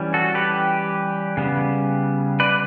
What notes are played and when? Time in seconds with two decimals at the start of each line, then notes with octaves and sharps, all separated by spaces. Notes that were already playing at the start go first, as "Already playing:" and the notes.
Already playing: E3 G3 C#4
0.14 F#4 A4
0.35 G4 B4
1.37 C#3 G3 B3
2.40 B4 D5